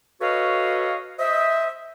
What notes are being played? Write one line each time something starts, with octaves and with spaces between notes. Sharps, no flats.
F#4 A4 B4 C#5 D#5 F5
C5 D#5 E5